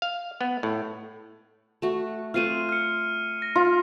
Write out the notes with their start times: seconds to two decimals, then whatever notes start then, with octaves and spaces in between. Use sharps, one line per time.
0.02 F5
0.41 B3
0.63 A2
1.82 A3 F#4
2.34 A3 C4 F4 F6 C7 D#7
2.69 F6 C#7
3.42 A#6
3.56 F4